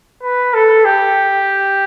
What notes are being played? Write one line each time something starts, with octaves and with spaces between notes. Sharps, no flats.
B4
A4
G4